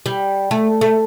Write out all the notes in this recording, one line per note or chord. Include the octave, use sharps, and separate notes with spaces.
G3
A3
A3